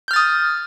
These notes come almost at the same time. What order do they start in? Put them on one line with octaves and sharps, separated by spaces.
G6 F6 A6 D#6